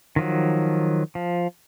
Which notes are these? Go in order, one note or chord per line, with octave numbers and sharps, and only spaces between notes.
D#3 F3 F#3
F3